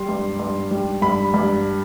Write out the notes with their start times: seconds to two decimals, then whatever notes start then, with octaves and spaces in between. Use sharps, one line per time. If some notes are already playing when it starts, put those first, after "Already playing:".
Already playing: G3 C6
0.09 G2
0.39 G2
0.71 G3
1.02 G2 B5
1.34 G2